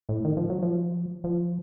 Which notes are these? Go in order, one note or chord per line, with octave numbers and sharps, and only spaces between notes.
A2
D#3
F3
F#3
F3
F3